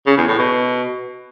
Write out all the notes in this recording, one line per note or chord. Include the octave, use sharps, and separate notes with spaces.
C#3
E2
A2
B2